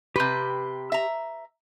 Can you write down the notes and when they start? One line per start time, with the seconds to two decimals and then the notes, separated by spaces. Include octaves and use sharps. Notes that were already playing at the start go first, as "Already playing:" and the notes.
0.16 C3 G4 B4 C6 G6
0.92 E5 A#5